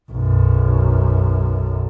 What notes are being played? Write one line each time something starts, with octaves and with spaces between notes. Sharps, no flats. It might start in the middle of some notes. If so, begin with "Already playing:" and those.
B1 F#2